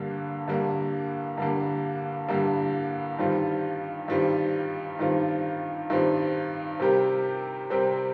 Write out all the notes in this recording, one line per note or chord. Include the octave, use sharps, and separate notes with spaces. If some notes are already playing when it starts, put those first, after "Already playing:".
Already playing: G2 D3 G3 A#3
G2 D3 G3 A#3
G2 D3 G3 A#3
G2 D3 G3 A#3
G2 D#3 G3 C4 F4
G2 D#3 G3 C4 F4
G2 D#3 G3 C4 F4
G2 D#3 G3 C4 F4
C3 G3 C4 G4 A#4
C3 G3 C4 G4 A#4